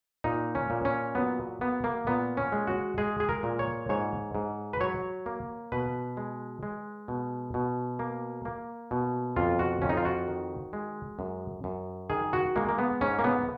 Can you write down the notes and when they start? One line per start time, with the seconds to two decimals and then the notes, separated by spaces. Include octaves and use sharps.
0.24 A#2 D#4
0.55 C#4
0.70 A#2
0.85 C#4
1.15 F#3 B3
1.61 A#3 B3
1.84 A#3
2.07 A#2 B3
2.37 C#4
2.52 G#3
2.67 F#4
2.98 G#3 G#4
3.20 G#4
3.29 A#4
3.43 A#2
3.59 C#5
3.89 G#2 C#5
4.35 G#2
4.73 B4
4.80 F#3 C#5
5.26 A#3
5.72 B2 B4
6.17 G#3
6.63 G#3
7.08 B2
7.54 B2
7.99 A#3
8.45 A#3
8.91 B2
9.36 F2 F4
9.59 F#4
9.82 F2 C#4
9.89 D#4
9.97 F4
10.05 F#4
10.28 D#3
10.73 G#3
11.19 F#2
11.64 F#2
12.10 D#3 G#4
12.33 F#4
12.56 G#3 A#3
12.69 A#3
12.78 B3
13.01 G#2 C#4
13.19 A#3
13.24 B3